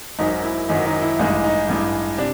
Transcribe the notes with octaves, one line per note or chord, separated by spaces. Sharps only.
G#1 F#2 D#3 F#3 D#4
E4
G#1 F#2 D#3 F#3 D#4
D#4
E4
A1 G2 E3 G#3 D#4
D#4
A1 G2 E3 G#3
C3 D4